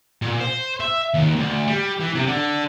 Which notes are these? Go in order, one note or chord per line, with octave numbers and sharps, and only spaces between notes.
A#2
C5
E5
D#2
D2
G3
E3
C3
D3